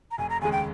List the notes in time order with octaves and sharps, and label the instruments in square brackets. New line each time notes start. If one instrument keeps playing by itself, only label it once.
[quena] A#5
[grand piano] F1 [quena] G#5
[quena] A#5
[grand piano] D#2 C#3 G#3 [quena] G#5
[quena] G5